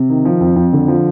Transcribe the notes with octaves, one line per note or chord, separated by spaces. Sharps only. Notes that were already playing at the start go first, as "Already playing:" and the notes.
Already playing: C3
D#3
F3
F2
F2
D3
F3